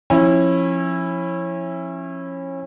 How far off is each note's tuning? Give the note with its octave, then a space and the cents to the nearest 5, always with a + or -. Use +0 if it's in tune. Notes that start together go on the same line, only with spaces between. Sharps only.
F3 +0 C#4 -30 E4 +0